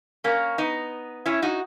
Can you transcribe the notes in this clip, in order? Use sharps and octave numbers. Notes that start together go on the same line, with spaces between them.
A#3 C#4
B3 D#4
C#4 E4
D#4 F#4